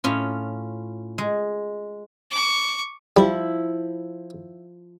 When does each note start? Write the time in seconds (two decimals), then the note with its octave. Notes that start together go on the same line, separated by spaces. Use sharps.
0.04 A2 C#4 F4
1.18 G#3
2.31 C#6 D6
3.17 F3 G3 E4